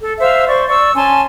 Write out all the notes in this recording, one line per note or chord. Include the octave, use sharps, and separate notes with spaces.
A4
C5 E5 F5 E6
C5 D5 C#6
D5 C#6 E6
C#4 G#5 A5 C6